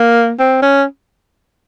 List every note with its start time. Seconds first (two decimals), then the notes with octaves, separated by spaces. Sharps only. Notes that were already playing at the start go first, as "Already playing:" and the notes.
Already playing: A#3
0.40 C4
0.62 C#4